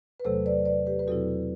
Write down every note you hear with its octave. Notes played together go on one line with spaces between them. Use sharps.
B4
E2 C3 F#3 A3 A4 C5
B4 D5
B4 D5
G4 B4
B4
E2 B2 F#3 C4 E4 F#4 A4